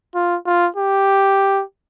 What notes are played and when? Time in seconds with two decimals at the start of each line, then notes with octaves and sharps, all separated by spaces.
0.15 F4
0.46 F4
0.77 G4